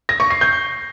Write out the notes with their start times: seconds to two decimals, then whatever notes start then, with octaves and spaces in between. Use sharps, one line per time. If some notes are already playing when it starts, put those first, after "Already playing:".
0.09 A#6
0.20 C#6
0.31 C7
0.41 G6